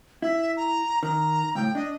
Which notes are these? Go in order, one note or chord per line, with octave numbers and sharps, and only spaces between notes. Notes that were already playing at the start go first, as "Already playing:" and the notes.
E4 E5
A#5
D#3 A#5
C#2 A2 G5
D4 D#5